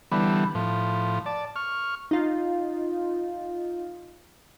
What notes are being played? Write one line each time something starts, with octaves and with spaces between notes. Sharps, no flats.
D3 E3 G3 B3
A2 F3
D5 A5
C#6 F6
D#4 F4